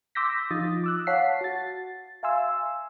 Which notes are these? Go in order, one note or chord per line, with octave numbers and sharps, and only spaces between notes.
C6 D6 E6 G6 A#6 B6
F3 D#4 F4 D#6 A6
D6 E6 F#6
C#5 F5 F#5 A5 B6 C7
F#4 A6
E5 F5 G#5 C6 E6